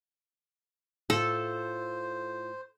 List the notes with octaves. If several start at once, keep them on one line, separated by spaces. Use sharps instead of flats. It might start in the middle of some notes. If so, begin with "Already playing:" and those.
A2 F4 A4 C5